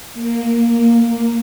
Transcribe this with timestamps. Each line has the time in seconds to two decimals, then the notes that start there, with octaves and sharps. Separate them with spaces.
0.14 A#3